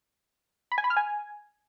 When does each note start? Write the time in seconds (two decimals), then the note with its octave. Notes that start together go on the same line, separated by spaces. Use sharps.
0.72 B5
0.78 G#5
0.84 B5
0.90 F6
0.97 G#5